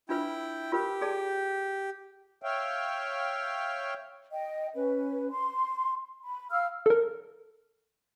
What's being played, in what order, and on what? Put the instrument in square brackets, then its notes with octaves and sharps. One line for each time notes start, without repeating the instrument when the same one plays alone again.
[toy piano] D4 F4 B4 [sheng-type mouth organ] E4 G5
[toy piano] F4 A#4 B4 [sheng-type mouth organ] G4
[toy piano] G#4 D5 A5
[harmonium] C#5 E5 F5 G5
[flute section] D#5 G5
C#4 B4
C6
B5
F5 E6 F6
[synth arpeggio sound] A4 A#4